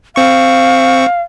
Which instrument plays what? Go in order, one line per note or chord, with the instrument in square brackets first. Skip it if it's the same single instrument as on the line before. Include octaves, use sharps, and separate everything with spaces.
[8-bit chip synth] C4 C#6 [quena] F5